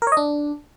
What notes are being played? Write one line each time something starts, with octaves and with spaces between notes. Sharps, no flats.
A#4
C#5
D#5
D4